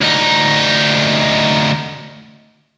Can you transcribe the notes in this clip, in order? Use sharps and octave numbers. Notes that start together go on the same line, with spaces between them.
D2 D#4